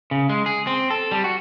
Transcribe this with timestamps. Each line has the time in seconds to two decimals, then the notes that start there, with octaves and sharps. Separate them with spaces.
0.11 C#3
0.29 G#3
0.46 G#4
0.67 C4
0.90 A4
1.11 G3
1.24 F#4